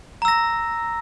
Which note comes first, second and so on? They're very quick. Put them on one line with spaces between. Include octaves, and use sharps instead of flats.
A#5 E6 A#6